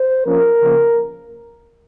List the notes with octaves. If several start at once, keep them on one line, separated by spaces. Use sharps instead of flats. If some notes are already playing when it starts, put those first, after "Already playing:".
Already playing: C5
F3 A#3 C#4 A#4
C#3 F3 A#3